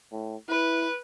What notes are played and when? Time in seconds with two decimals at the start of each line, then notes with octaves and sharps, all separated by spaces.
0.12 A2
0.49 E4 B4